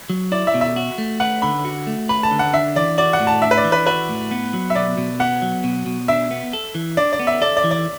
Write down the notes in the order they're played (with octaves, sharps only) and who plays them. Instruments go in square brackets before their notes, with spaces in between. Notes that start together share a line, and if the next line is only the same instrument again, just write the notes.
[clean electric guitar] F#3
[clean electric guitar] E4 [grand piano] D5
[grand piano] E5
[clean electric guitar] B2
[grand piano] E5
[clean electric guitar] F#4
A3
[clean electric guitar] B4 [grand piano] F#5
[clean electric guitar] D3 [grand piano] B5
[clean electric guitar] F#4
A3
[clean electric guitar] B4 [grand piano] B5
[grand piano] A5
[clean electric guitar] D3
[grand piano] F#5
[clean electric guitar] D4 [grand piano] E5
[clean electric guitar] E3 [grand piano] D5
[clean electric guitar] F#4 [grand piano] D5
[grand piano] F#5
[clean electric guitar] A2
[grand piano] A5
[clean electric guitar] D4 [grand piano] E5
[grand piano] B4
D5
[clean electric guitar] E3
[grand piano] B4
[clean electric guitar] F#4 [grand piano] B4
[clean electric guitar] A2
B3
F#3
[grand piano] E5
[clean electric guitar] B2 [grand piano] D5
[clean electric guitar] B2
[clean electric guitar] B3 [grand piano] F#5
[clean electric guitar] F#3
B2
B2
[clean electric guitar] D4 [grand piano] E5
[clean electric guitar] B3
A4
E3
[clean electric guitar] D4 [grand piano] D5
[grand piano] D5
[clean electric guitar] B3
[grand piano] E5
[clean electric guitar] A4 [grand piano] D5
[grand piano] D5
[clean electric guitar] E3
[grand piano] D5